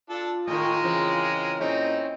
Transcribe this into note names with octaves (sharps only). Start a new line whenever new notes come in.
D4 F4 A4
A2 D#3 G#3 A#4 D#5
C#3 E3 C4
A#2 C4 C#4 D#4 E4 D#5